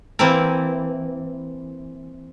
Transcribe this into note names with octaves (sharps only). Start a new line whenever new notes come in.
E3 A#3 C4 E4 A#4